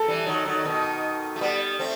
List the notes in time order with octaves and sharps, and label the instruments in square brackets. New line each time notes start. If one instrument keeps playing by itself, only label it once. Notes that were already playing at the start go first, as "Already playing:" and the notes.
Already playing: [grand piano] A4
[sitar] E3 G3
D#3 F#3
D#3 F#3
B2 D#3
A3
G3 B3
A3 C4